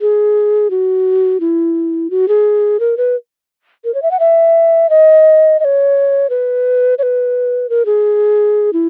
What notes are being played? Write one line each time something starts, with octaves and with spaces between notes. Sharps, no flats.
G#4
F#4
E4
F#4
G#4
A#4
B4
A#4
C#5
E5
F#5
E5
D#5
D#5
C#5
B4
C#5
B4
A#4
G#4
E4